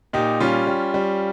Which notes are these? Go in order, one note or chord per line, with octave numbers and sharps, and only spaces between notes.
A#2 D#4 G4
G3 C#4 F4
G3
G3